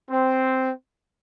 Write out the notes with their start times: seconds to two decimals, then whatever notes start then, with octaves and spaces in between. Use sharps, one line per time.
0.10 C4